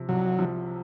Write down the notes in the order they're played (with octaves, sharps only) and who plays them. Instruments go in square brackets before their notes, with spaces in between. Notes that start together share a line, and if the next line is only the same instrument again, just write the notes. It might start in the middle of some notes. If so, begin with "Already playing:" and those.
Already playing: [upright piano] C3 F3
[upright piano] C2 [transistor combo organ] F#3
[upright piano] F3